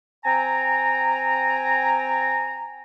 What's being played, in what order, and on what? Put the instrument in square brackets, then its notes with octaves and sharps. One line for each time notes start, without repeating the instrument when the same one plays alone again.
[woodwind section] C4 G5 G#5 A#5